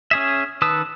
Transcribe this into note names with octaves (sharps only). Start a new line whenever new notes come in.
C#4 G#4 E5
D#3 B4 A5 D#6 E6